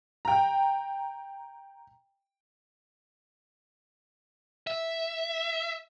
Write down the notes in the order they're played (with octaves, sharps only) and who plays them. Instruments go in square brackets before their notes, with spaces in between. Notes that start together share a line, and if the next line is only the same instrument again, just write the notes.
[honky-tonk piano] G5 A#5
[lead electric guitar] E5